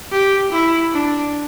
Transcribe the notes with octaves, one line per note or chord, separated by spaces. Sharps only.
G4
E4
D4